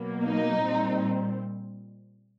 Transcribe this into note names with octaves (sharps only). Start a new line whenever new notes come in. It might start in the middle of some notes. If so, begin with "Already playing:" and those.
Already playing: B2 F#3 A#3
D#4
A#2 G3 C4